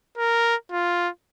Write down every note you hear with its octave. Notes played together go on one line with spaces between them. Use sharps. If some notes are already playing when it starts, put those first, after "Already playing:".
A#4
F4